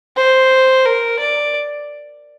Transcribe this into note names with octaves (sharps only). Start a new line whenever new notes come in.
C5
A#4
D5